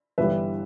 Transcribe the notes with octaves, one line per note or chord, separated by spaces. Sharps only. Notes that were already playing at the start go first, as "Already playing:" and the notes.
G1 G2 E3 G3 B4 E5